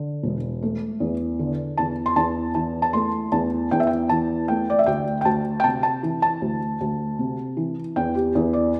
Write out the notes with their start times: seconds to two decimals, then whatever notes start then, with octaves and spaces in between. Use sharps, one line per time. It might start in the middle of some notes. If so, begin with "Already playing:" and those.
Already playing: D3
0.23 E1
0.62 A3
1.00 E2
1.39 D3
1.78 E2 A5
2.06 C6
2.16 E2 A5
2.55 E3 A5
2.82 A5
2.93 A3 C6
3.32 E2 A5
3.71 E2 G5
3.80 E5
3.87 G5
4.09 E3 A5
4.48 A3 G5
4.70 D5
4.79 E5
4.86 D2 G5
5.21 G5
5.25 D2 A5
5.60 G5
5.64 C3 A5
5.83 A5
6.03 E3
6.22 A5
6.42 D2
6.81 D2
7.19 C3
7.57 E3
7.96 E2 G5
8.15 G4
8.35 E2
8.53 D5